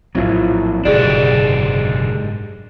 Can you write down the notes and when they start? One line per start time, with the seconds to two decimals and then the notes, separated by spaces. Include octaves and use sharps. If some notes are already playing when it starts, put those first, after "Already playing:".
0.15 A#1 A2 F#3 C4 E4 F4
0.85 F#1 G#2 B2 D3 D4 G4 G#4 D5